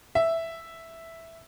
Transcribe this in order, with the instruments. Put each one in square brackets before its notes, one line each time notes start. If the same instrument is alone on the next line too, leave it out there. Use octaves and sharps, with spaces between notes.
[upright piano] E5